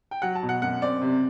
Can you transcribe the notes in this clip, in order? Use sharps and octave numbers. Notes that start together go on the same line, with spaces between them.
G5
F#3 F#5
A5
B2
F#5
F#2 F#5
C4 D5
C3